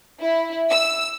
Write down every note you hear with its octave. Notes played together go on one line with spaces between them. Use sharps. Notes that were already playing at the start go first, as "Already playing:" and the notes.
E4
E6